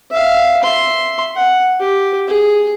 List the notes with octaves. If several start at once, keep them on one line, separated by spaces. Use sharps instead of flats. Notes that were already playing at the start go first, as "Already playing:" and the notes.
E5 F5
E5 C6
F#5
G4
G#4